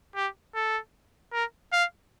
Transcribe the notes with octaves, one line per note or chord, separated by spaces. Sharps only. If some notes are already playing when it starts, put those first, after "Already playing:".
G4
A4
A#4
F5